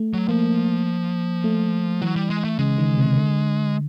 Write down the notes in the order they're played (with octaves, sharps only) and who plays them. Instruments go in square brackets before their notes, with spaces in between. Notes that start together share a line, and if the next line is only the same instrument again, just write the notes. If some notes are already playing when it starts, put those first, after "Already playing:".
Already playing: [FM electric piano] A3
[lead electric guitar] F#3
[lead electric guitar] F3 [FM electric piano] A#3
[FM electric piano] A3
[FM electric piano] E3 [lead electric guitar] F#3
[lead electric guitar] G3
G#3
A3
[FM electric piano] C#3 [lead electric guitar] G#3
[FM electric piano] D#3
C3
D3